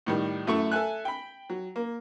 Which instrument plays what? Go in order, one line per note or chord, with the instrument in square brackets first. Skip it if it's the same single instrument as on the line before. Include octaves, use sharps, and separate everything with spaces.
[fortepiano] A2 D#3 G3
F#2 A3 E4 A4 C#6
A4 E5 G#5 F#6
G5 B5
F#3
A#3